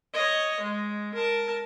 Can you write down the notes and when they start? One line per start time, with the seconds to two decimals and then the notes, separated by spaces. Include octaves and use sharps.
0.14 C#5 D#5
0.60 G#3
1.14 A#4 A5